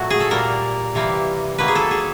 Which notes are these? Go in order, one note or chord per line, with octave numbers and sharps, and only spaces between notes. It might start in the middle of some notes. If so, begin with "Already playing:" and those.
Already playing: A#2 F#3 A3 F#4
G#4
A4
A#2 G3 A#3 A#4
C3 E3 G3 A#3
D#3 F#3 A#3 B4
G#4
A4
G#4